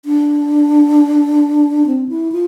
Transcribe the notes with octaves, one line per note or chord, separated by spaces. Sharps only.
D4
C4
E4
F4